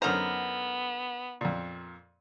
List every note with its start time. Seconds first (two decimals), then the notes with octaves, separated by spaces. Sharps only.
0.02 F#2 D3 B3 D#4 A#4 C5
1.41 F2 A#2